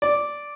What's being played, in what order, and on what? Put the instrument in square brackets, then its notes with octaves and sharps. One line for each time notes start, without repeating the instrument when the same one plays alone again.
[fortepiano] D5